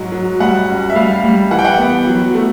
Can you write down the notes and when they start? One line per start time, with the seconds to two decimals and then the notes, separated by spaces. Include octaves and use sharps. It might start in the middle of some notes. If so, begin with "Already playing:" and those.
Already playing: G#2 F#3
0.12 F#3
0.40 G3 F#5
0.68 C#2
0.90 E5
0.95 G3 F5
1.24 G3
1.51 E3 F#5
1.59 G5
1.65 F#5
1.78 B3
2.07 F#3
2.34 A3